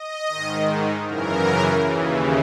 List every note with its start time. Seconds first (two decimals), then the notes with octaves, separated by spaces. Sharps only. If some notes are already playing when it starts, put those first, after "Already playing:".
Already playing: D#5
0.29 G#2 D#3
1.06 F#2 C#3 E3 A#4
1.83 D#2 C#3 E3